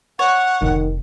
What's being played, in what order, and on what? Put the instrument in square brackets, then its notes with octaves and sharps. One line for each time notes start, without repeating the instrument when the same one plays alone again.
[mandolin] C#5 [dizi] F#5
[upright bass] F1 [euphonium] D#3